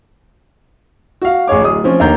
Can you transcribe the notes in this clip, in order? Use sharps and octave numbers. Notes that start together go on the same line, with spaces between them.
F#4 F5
A1 G#4 C#5 D6
D1 D#6
F3 C4 C#4
D#2 D3 D#3 A#3 A#5 G6